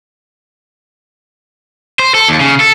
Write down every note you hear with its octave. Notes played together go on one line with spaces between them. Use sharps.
C5
A4
D#2
C#3
A4